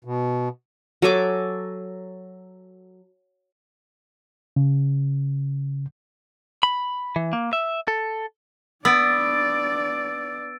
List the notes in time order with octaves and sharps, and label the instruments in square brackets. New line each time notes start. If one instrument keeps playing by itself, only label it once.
[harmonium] B2
[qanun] F#3 A4 G#5 D6
[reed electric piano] C#3
[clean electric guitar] B5
E3
A#3
E5
A4
[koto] B3 [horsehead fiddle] D4 D5 [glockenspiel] E6 A6 D7